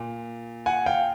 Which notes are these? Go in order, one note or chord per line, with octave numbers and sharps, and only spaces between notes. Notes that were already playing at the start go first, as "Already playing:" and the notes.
Already playing: A#2
F#5 G#5
F5 G5